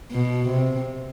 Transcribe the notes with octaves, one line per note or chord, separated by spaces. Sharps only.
B2
C3